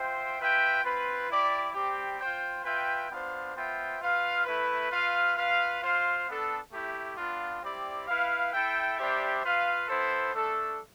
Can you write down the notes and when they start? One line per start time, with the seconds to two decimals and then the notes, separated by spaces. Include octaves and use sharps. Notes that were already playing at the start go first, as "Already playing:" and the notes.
Already playing: F4 C5 E5 G5
0.38 F4 B4 E5 G5
0.83 C4 F4 B4
1.28 E4 G4 D5
1.74 G3 C4 G4
2.19 F4 C5 G5
2.64 F4 B4 E5 G5
3.09 B3 D4 F4 C5 F5
3.54 B3 F4 C5 E5 G5
4.00 F4 B4 F5
4.45 A3 E4 B4
4.91 F4 B4 F5
5.35 F4 B4 F5
5.81 F4 C5 F5
6.26 B3 D4 A4
6.72 A3 E4 G4
7.17 B3 D4 F4
7.62 G3 C4 E4 G4 D5
8.07 E4 B4 F5
8.52 E4 A4 E5 G5
8.98 G3 D4 G4 C5 E5
9.43 F4 B4 F5
9.88 B3 E4 A4 C5
10.33 A3 D4 A4